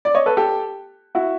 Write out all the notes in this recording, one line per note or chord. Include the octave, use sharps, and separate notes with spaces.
D5
C#5 D#5
A4 B4
G4 A4
E4 F#4